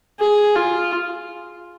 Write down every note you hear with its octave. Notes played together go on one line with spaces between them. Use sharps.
G#4
F4